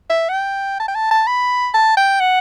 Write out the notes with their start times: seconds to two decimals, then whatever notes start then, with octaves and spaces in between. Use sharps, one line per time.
0.10 E5
0.29 F#5
0.33 G5
0.80 A5
0.88 G5
0.95 A5
1.11 A5
1.27 B5
1.74 A5
1.97 G5
2.20 F#5